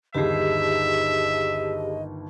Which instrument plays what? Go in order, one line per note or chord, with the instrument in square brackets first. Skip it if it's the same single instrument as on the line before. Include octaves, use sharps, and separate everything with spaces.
[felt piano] G1 D#2 C7 [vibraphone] G4 G#4 [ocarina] D#5 [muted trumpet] E5